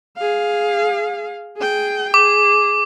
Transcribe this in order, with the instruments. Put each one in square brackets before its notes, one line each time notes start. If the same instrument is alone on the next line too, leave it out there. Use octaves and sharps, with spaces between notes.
[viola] G#4 F5
G#4 G5
[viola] G#4 [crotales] D6